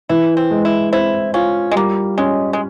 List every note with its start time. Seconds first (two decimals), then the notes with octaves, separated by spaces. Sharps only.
0.09 E3 E4
0.37 C4
0.51 G#3
0.65 E4
0.93 C4 E4
1.34 C#4 F4
1.71 G#3
1.76 G3 A#3
2.18 G#3 C#4
2.53 G#3